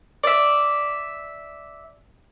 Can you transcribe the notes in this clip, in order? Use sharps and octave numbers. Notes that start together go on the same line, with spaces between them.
D5 E5